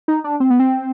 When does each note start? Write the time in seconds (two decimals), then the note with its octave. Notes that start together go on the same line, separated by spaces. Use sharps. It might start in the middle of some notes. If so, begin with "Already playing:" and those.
0.08 D#4
0.24 D4
0.40 C4
0.50 B3
0.60 C4